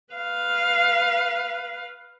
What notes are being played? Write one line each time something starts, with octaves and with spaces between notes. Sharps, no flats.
B4 F5